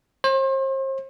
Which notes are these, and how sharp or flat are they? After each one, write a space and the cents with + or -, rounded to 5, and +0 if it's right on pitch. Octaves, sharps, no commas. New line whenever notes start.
C5 +40